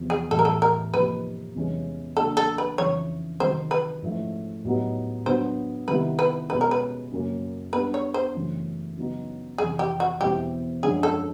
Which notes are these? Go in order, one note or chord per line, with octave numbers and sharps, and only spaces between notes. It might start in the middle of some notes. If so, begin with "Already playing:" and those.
Already playing: E2 C3 F3
G#4
A2 E3 G3 A4
A#4
A4
A#4
C3 F3 A#3 D#4 G4 B4
E2 C3 E3 G#3 C#4
C#3 F#3 A#3 D4 A4
A4
B4
F2 C#3 E3 C#5
C3 D#3 F#3 C5
B4
G#2 F3 A3 C#4 E4
A2 F#3 B3 D#4 G4
D3 F#3 B3 C5
C3 D#3 G3 B3 E4 B4
B4
B2 G#3 C#4 B4
A#4
B4
F#2 C#3 F#3 A#3 C#4
G3 B3 D4 B4
C#5
C5
F#2 C#3 E3 A3 C#4
C#3 F#3 B3 D#4
F2 C3 E3 G#4
G4
F#4
E2 B2 G3 C4 E4 G4
F#2 D3 F3 G#3 C#4 G#4
A4